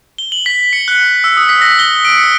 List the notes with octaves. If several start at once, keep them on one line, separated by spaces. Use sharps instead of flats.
G7
F#7
B6
C#7
F#6
E6
D#6
B6
A#6
G7
D7
C#7